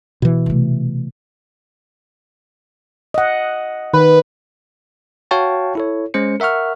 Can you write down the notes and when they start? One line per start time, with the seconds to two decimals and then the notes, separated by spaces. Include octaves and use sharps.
0.22 B2 E3
0.46 C3 A3
3.14 D#5 F#5
3.94 D#3 B4
5.31 F#4 C#5 F5 G5 A5 C#6
5.75 E4 A4 C#5
6.14 G#3 C#4 C5 C#7
6.40 A#4 E5 F#5 C#6 F6